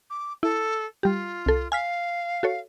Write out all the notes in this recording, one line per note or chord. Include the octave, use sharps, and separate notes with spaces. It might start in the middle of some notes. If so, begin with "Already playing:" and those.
D6
E4 A4
G3 F4 G4
C2 A4
F5 G#5 F6 B6
F#4 A4 C#5